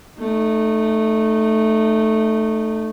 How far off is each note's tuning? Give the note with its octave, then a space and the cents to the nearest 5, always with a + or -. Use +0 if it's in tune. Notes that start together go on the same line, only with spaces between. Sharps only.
A3 +0 D#4 -30